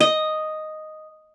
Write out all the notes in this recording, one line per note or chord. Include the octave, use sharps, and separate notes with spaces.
D#5